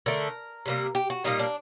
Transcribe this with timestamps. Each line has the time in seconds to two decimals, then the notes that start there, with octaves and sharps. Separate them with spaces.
0.06 D3 A3 A#4
0.66 C3 G3 A#3
0.95 G4
1.10 F#4
1.24 A#2 G3 A#3 D#4
1.39 D4